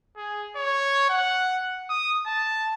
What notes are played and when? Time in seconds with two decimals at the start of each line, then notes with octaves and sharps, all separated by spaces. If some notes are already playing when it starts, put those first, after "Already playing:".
0.17 G#4
0.56 C#5
1.09 F#5
1.89 D#6
2.26 A5